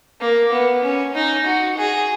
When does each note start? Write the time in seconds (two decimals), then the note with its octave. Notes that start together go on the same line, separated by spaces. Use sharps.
0.21 A#3
0.52 B3
0.84 C#4
1.15 D#4
1.46 F#4
1.78 G#4